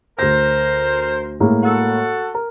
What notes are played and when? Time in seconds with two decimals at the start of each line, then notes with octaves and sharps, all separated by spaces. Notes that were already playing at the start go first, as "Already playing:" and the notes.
0.19 D2 A#4 C5 A#6
1.40 A2 G#3 A#3
1.63 F#4 A4
2.34 A#4